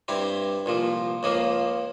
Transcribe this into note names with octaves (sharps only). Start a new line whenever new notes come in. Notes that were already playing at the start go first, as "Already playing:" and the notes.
G2 G3 C4 E4
C2 A#2 F3
C#2 C#3 F3 A#3